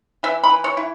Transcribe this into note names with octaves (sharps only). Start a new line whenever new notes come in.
E3 E5
B5
E3
C#5
E4